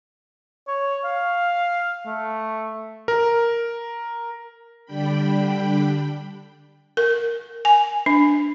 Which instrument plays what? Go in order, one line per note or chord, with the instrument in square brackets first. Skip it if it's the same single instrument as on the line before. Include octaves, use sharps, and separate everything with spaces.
[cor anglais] C#5
F5
A3
[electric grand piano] A#4
[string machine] D3 G3 D4 G5 B5
[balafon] A#4
G#5
D4